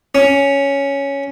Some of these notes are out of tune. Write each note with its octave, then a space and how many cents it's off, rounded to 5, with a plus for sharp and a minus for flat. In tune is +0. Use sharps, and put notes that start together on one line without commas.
C#4 +5